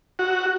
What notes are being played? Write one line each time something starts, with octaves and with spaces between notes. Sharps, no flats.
F#4